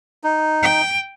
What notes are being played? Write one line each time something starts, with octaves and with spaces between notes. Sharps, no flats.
D#4
G5